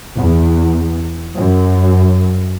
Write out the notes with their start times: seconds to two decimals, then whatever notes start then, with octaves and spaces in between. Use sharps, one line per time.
0.17 E2
1.37 F#2